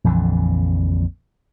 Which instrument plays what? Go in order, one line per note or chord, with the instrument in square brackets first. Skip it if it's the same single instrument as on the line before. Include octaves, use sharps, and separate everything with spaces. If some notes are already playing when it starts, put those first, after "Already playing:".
[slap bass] A#1 F2 D3 E3